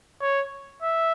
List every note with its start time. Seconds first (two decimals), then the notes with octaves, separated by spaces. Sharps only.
0.21 C#5
0.82 E5